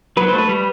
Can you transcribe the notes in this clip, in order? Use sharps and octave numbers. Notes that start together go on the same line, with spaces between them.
F#3 B4
C5
A3
B4
G3